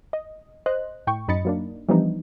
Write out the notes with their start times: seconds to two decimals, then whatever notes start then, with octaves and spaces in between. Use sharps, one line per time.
0.13 D#5
0.66 C5 D#5 F#6
1.07 A2 G5 C#6
1.28 F#2 D#4 D#5 B5 A6 C#7
1.45 F#3 A#3 D4
1.89 E3 F3 G3 B3 D4 D#4